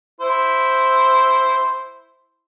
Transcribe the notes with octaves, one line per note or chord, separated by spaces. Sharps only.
E4 C5